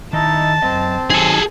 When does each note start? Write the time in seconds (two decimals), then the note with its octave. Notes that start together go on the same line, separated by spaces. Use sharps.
0.13 D#3 D#4 E4 D#5 A5
0.62 F#2 C4 D#5
1.10 D#3 F#3 D#4 G#4 A4